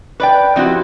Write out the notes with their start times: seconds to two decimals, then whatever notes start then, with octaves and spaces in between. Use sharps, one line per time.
0.20 B4 D5 G5
0.56 F3 C4 E4 F#4 G4